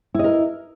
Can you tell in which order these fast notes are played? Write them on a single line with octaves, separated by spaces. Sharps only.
E4 D#5 A#4